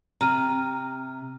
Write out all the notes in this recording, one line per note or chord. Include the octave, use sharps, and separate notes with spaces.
C3 A#5 F6 D#7